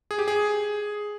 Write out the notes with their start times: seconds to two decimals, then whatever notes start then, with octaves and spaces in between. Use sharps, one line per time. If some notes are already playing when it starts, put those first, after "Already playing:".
0.11 G#4
0.19 G4
0.28 G#4